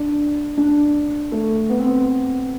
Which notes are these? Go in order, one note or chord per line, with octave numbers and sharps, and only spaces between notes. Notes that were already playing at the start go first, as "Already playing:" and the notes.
Already playing: D4
D4
A3
B3
C4
B3